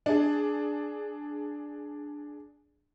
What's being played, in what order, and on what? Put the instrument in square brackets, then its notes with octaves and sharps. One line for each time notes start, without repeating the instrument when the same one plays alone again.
[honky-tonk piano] D4 G#4